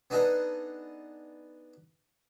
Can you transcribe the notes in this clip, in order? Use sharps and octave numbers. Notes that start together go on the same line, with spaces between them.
B3 D4 D#4 G#4 A4 B4